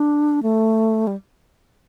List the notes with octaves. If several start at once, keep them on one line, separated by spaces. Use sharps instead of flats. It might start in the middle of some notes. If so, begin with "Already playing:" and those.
Already playing: D4
A3
G3